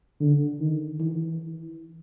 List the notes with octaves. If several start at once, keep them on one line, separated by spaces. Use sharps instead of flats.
D3
D#3
E3